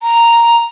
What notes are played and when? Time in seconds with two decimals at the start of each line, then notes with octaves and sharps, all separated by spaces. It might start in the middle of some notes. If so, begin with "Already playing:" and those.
0.03 A#5